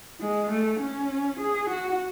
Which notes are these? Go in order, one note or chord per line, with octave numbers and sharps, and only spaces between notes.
G#3
A3
C#4
G#4
F#4